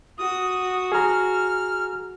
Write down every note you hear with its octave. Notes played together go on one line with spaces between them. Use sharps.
F#4 D#6
G#4 A#5 F6